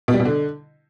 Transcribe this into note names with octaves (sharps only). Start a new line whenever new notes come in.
B2
G3
B2
D3